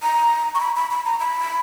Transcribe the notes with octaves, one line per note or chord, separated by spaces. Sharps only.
A#5
C#6
B5
B5
B5
A#5
B5